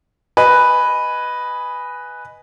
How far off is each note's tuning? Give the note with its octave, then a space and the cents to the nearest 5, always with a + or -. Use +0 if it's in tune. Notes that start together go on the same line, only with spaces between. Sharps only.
B4 +0 D#5 +0 G#5 +0